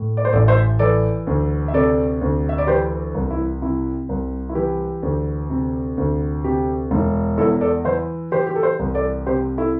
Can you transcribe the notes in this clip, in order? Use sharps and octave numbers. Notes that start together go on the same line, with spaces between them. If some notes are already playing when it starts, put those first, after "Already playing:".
Already playing: A2
D5
C5
A1 A4 D5
C5 E5
E3 A4 D5
D2
E5
C3 A4 D5
D2
E5
D5
E3 G4 C5
C2
E4
C3 E4
C2
E4
E3 G4
D2
C3
D2
C3 G4
E1
E2 E4 A4
A4 D5
E3 C5 E5
E3 G4 C5
G4
A4
G4 C5
C2
A4 D5
C3 G4 C5
E4 A4